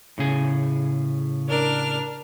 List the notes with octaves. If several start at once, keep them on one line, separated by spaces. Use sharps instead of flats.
A2 C#3 G#4
D4 A#4 F6